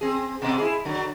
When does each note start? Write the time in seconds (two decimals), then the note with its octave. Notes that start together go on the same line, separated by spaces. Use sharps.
0.01 C4 G#4
0.42 B2 G#3 C4
0.58 E4 G#4
0.85 D3 F#3